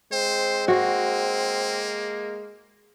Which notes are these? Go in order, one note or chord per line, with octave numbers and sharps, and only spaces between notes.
G#3 C4 C5
A#3 F#4 F#5